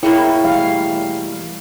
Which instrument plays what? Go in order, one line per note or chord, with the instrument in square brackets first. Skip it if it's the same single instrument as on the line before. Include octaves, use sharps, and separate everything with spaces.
[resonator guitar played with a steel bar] B2 A#3 C#5 [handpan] E4 [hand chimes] G#4 G5
[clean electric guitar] E3 G3 A3 [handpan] F5